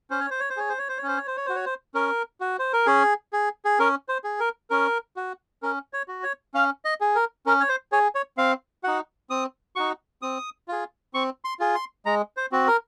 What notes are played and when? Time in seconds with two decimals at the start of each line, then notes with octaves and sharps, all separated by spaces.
0.10 C#4 C5
0.20 C#5
0.31 C5
0.40 C#5
0.50 C5
0.57 G#4 C#5
0.69 C5
0.79 C#5
0.89 C5
0.98 C#5
1.03 C#4 C5
1.17 C#5
1.27 C5
1.37 C#5
1.46 F#4 C5
1.56 C#5
1.66 C5
1.94 C#4 A#4
2.41 F#4
2.59 C5
2.73 A#4
2.86 C#4 G#4
3.33 G#4
3.65 G#4
3.79 C#4 A#4
4.09 C5
4.24 G#4
4.40 A#4
4.70 C#4 A#4
5.16 F#4
5.63 C#4 A#4
5.93 C#5
6.08 F#4
6.23 C#5
6.54 C#4 F5
6.85 D#5
7.01 G#4
7.15 A#4
7.46 C#4 A#4
7.60 C#5
7.69 C5
7.92 G#4 C#5
8.15 C#5
8.38 C4 F5
8.84 D#4 F#4 F#5
9.30 C4 D#6
9.76 D#4 F#4 C#6
10.22 C4 D#6
10.68 F4 G#4
11.14 C4 C#6
11.45 C6
11.60 F4 G#4
11.75 C6
12.06 G#3 A#5
12.37 C5
12.52 C4 F#4
12.68 A#4